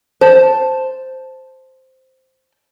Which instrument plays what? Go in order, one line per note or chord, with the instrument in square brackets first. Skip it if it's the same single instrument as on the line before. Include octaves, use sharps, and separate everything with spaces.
[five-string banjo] C5 [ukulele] A5